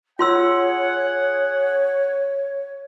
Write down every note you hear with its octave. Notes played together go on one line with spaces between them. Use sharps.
F4 G#4 C#5 F#5 C6 E6